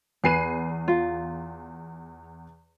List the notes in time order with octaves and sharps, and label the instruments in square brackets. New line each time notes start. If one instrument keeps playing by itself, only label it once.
[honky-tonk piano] E2 C7 D#7 [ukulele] G#4 B4
[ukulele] F4